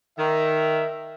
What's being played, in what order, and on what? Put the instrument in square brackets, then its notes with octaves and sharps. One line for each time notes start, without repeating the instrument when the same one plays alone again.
[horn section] D#3 [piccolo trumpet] E5